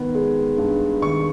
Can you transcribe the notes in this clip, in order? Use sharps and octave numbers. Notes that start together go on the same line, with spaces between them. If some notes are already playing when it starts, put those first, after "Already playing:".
Already playing: D#3 B3
G#3
G2
D#3 C#6